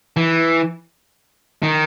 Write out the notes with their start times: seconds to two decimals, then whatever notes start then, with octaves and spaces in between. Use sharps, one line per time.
0.17 E3
1.63 D#3